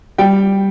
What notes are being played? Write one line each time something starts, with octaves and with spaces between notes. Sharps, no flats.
G3 G5